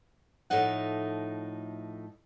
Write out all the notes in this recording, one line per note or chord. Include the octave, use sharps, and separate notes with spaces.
A2 F3 A3 D#4 F#5